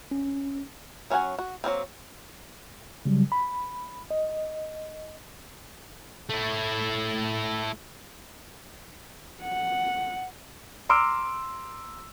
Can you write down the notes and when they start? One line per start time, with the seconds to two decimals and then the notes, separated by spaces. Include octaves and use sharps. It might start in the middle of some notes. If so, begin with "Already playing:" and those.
0.11 C#4
1.10 F#3 C#4 F4 F#5 G#5
1.39 F#4
1.64 F#3 G3 A#3 C4
3.05 C#3 F#3 G3
3.32 B5
4.11 D#5
6.30 A3 E4
9.42 F#5
10.89 A#5 C6 D6 E6 F6 D7